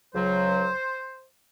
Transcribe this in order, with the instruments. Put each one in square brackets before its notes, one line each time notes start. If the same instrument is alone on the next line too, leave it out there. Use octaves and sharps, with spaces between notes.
[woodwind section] C#2 C#3 F#3 C5